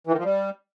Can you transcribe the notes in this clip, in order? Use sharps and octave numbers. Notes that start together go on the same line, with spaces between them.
E3
D#3
F3
G3